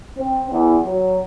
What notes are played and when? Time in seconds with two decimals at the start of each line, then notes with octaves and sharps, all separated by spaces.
0.17 C4
0.52 E2
0.84 F#3